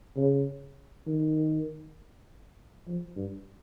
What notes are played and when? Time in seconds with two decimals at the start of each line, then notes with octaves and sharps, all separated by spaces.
0.17 C#3
1.07 D#3
2.87 F3
3.16 G2